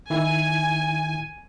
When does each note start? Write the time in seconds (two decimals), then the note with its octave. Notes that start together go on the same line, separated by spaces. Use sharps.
0.10 D#3 E4 G#5